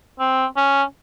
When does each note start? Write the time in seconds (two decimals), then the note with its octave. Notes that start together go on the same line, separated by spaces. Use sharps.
0.20 C4
0.57 C#4